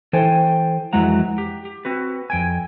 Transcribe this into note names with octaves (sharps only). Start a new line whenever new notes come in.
E3 A4 C5 G5 G#5
F2 E3 F#3 G#3 F#5 A#5
G4
G4
C4 F#4 B4
F2 G5 G#5